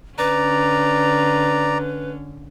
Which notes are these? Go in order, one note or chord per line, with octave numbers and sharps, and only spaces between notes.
D3 C#4 B4 D5 A#5